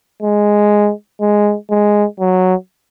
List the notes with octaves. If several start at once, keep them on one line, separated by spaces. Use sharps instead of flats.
G#3
G#3
G#3
F#3